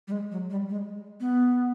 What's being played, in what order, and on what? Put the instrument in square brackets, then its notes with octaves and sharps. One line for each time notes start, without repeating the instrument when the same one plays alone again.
[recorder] G3
G#3
F#3
G3
G#3
B3